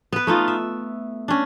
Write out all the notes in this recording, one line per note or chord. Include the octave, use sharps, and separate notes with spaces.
B3 B4
A3 D#4 F4
E5
C#4 D4